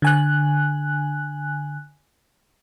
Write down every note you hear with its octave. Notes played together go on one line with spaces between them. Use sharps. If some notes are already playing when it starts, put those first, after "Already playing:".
D3 G#5 F#6